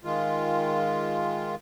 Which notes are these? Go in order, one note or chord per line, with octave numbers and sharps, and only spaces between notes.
D#3 G#3 F4